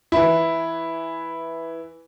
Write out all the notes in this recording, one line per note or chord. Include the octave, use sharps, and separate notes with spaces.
E3 E4